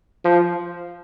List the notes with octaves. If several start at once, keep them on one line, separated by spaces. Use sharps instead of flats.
F3